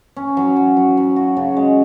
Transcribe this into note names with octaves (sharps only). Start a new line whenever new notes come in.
C#4
F#3
F#3
F#3
F#3
F#4
C#3
G#3